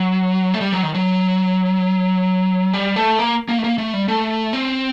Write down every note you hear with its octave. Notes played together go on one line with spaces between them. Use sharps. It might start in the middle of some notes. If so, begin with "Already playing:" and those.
Already playing: F#3
A3
G3
F#3
D#3
F#3
G3
A3
A#3
A#3
A3
A#3
A3
G3
A3
C4